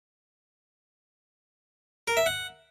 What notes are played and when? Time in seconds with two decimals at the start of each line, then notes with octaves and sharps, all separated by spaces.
2.08 A#4
2.17 E5
2.26 F#5